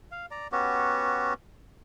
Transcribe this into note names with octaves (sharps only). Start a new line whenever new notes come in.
F5
D5 A#5
B3 C#4 F#4 G4